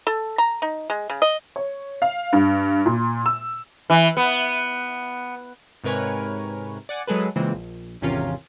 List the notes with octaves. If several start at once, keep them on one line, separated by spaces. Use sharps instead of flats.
A4
A#5
D#4
G#3
C#3
D#5
C#5
F5
G2
A#2
E6
E3
B3
G#2 C3 A#4 B4 C#5 G#5
D5 F#5 G#5
F#3 G#3 G#4 A4 B4
A#2 C#3 E3 G#3 C4
A#1
G#1 E2 C3 C#4 F4 A#4